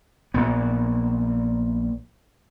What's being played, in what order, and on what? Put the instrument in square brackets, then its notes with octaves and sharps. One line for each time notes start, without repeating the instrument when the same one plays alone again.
[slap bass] A#1 A#2 B3